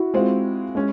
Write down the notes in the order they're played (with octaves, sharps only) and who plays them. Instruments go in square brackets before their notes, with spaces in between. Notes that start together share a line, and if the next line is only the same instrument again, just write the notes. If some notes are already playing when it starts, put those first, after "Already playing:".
Already playing: [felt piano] E4 F#4
[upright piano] G#3 C4 F4
G#3 C#4